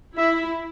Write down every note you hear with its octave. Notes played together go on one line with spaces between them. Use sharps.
E4 E5